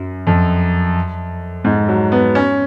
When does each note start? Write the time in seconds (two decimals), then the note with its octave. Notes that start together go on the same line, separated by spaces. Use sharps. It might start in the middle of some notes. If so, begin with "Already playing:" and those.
Already playing: F#2
0.27 F2
1.64 G#2
1.88 F#3
2.12 B3
2.35 C#4